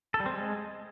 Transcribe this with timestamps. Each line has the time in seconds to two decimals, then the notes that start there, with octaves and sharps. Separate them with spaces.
0.14 A4
0.20 G3
0.26 C4
0.32 G#3